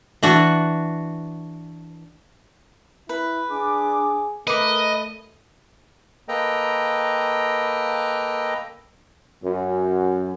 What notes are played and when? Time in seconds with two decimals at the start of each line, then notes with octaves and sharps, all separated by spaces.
0.23 E3 D4 F#4
3.09 E4 B4
3.49 D4 G#4 D6
4.47 A3 A#4 B4 D#5 D6
6.28 A#3 A4 B4 D#5 G5 A#5
9.43 F#2